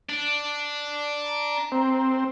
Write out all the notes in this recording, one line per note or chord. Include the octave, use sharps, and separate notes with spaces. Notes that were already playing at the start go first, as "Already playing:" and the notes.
D4
A#5
C4